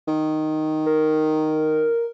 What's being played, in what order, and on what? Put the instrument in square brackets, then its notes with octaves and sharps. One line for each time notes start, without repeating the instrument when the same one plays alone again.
[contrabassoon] D#3
[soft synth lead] A#4